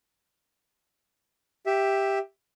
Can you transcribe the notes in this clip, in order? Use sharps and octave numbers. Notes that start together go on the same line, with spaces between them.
G4 E5